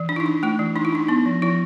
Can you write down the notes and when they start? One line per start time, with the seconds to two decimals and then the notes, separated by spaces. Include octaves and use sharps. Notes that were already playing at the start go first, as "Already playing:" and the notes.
Already playing: E3
0.09 D4
0.16 E4
0.20 D#4
0.26 D4
0.43 A3 E4
0.59 E3
0.76 D4 D#4
0.85 E4
0.93 D4 D#4
1.08 B3 D#4
1.26 F3
1.42 F3 E4